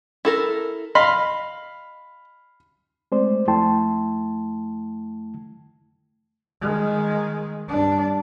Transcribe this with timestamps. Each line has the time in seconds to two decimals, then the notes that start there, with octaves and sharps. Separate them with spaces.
0.25 E4 A4 A#4
0.95 D#5 F5 B5 C6
3.12 G#3 A3 C4 C5 D5
3.48 F2 A3 E4 G5 A5 C6
6.61 D#3 G#3
7.68 G2 D4